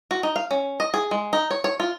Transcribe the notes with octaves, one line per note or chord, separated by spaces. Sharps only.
F#4
D#4
F5
C#4
D#5
G#4
G#3
D#4
C#5
C#5
F4